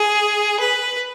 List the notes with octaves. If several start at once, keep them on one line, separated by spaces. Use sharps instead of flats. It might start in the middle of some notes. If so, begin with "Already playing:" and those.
Already playing: G#4
B4